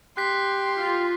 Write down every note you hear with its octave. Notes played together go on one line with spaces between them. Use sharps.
G4 C6 F#6 B6
F4